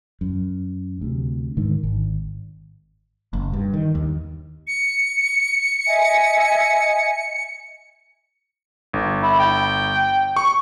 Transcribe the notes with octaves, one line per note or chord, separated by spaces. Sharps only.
F#2
D2 C3
G#2 D3 D#3
G#1
F#1
G2
D#3
D#2
C#7
D#5 E5 G#5
G1
E4
G5
C#6